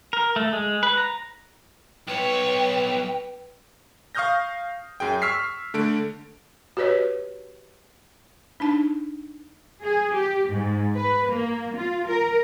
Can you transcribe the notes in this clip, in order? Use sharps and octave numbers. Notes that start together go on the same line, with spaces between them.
A#4
A3
G#3
B4
A#5
B1 B4 C#5 G5
F5 C#6 D#6 F6 G6 A#6
F#2 G#4 G5
C#6 E6 F6 B6 C7
D3 A3 D7
F#4 G4 B4 C#5 D#5
D4 D#4 A5
G#4
G4
G#2
B4
A#3
F4
A#4